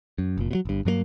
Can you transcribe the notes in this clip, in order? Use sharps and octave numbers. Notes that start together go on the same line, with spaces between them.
F#2
F1 A#2
B2 F#3
G1 G2
G2 F#3 G3 A#3